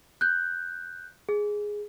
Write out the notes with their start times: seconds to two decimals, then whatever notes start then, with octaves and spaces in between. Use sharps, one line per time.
0.21 F#6 G6
1.29 G#4